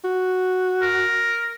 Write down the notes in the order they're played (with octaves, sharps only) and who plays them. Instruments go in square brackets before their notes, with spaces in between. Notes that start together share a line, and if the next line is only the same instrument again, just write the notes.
[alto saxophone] F#4
[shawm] A#4